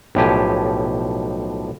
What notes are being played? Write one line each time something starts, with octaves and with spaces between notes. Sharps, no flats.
B1 A2 F3 G4 G#5